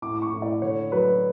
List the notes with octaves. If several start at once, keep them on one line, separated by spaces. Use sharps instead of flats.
A2 D6
D6
C#6
A2
D5
D3 C#5
F#3 B4